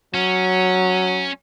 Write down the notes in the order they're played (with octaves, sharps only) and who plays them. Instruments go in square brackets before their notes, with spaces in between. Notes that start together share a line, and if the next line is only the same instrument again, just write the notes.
[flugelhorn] F#3 [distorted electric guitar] C#4